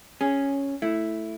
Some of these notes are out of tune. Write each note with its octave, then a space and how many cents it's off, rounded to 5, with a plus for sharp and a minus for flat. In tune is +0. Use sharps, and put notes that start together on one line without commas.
C#4 +0 G#4 +0
A3 +0 E4 +0